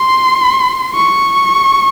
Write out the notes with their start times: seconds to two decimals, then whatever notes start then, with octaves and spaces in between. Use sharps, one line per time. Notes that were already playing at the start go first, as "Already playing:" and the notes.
Already playing: C6
0.95 C#6